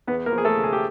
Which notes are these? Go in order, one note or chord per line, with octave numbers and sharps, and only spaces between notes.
E2 B3 B4
A#3 A#4
F3
G#4
A3 A4
C#3
G#4
G4